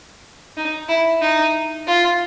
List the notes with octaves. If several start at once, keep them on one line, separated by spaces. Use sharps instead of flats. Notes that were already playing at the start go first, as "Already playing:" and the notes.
D#4
E4
D#4
F4